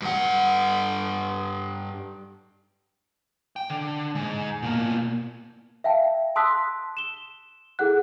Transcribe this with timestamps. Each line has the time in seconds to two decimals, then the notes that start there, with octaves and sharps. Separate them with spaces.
0.02 G2 F#5
3.56 G5
3.70 D3
4.15 G#2
4.62 B2 A#3
5.84 E5 F5 G5 A5
6.36 A5 C6 D#6 E6 F#6 B6
6.97 E7 G7
7.79 E4 G#4 A4 F#5 F#6